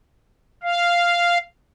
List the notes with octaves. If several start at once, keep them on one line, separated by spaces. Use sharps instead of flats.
F5